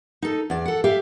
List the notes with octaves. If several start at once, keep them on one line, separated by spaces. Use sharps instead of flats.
D#4 A4
E2 D5
A4 F#5
G4 E5 F5